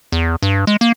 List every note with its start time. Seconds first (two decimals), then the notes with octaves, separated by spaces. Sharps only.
0.12 E2
0.42 G2
0.67 G#3
0.81 A#3